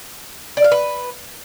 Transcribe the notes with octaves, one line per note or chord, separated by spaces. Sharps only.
D5
F5
B4